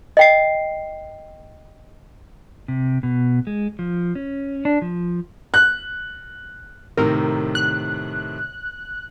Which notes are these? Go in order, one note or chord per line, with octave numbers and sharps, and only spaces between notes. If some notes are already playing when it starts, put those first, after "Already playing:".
D#5 G5 C7
C3
B2
G#3
F3
C#4
D4
F3
F#6
A2 C3 D#3 A#4
F#6